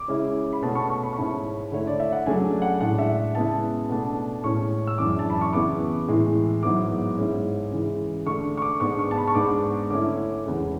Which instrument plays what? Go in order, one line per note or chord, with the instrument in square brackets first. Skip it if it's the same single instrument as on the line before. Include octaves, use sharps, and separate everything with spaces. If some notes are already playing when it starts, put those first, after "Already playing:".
Already playing: [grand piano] D6
C#3 G#3 C#4 E4
B5
B2 A3 C#4 A5
C#6
C#6
B5
C#6
G#2 G#3 C#4 E4 B5
D3 A3 E4 C#5
D5
E5
F#5
C#3 F#3 A3 D4 G#5
F#5
A2 G#3 D4 F#5
E5
C#3 G#3 B3 E4 A5
B2 A3 D4
A2 G#3 C#4 C#6
E6
F#2 E3 G#3 D4 D6
A5
B5
C#6
C#3 E3 B3 E4 D6
A2 E3 G#3
G#2 F#3 B3 E4 D6
G#2 G#3 C#4 E4
C#3 E3 G#3
D3 A3 D4 C#6
C#6
D6
G#2 G#3 B3 D4 C#6
C#6
A5
B5
C#6
G#2 G#3 B3 D4 D6
D3 A3 C#4 E4 D6
E2 C#3 G#3